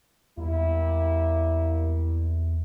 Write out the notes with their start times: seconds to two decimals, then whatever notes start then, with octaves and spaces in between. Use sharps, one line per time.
0.37 E2 G3 A#3 E4